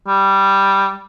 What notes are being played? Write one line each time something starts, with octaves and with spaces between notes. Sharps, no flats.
G3